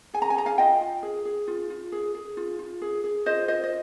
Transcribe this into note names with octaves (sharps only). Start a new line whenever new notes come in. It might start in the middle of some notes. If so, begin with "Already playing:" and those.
G#4 G#5
A#5
G#5
G#4 A#5
F5 G#5
F4 D#5 G5
F4
G#4
G#4
F4
F4
G#4
G#4
F4
F4
G#4
G#4
F4 C5 D#5
F4 C5 D#5
D#5